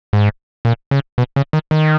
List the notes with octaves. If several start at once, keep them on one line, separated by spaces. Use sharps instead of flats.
G#2
A#2
C#3
B2
C#3
D#3
D#3